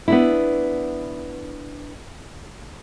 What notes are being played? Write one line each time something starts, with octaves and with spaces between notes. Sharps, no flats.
B3 D4 E4